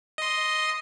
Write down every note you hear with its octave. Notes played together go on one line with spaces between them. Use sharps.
D#5 C6